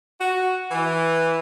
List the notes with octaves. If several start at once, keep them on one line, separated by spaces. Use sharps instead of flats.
F#4
E3